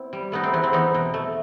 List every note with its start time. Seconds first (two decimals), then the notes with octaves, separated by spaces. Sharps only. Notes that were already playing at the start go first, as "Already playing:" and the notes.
Already playing: B3 C4 E4
0.13 G3
0.32 A3 B3 D#4
0.43 C4
0.53 E2 B3
0.63 C4
0.73 E2 B3 D#4
0.94 B2
1.14 A3